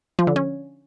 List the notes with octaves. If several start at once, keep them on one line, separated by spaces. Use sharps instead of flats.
F3
D3
C#4